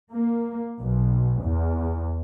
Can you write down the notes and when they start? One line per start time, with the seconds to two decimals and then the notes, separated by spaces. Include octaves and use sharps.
0.12 A#3
0.81 B1
1.43 E2